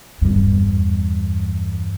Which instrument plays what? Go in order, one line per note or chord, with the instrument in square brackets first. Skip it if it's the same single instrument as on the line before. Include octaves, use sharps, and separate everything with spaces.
[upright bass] E2 G2